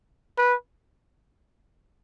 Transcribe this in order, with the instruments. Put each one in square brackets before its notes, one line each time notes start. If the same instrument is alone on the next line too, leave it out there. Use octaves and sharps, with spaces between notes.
[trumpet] B4